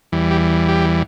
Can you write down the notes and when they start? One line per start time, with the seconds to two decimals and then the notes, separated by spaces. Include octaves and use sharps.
0.12 E2 E3 G3
0.31 G4
0.69 G4